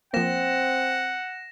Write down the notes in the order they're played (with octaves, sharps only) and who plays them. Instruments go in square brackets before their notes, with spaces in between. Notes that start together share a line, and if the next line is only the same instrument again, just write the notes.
[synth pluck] F3 A#3 [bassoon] C4 [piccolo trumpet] F#5 [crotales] A#6 E7